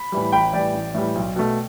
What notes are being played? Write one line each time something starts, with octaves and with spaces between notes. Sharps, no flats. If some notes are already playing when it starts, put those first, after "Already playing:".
Already playing: B5
A2 E3 G3
A1 G5 B5
A2 E3 G3 D5 G5
A1
A2 E3 G3
B1
B2 A3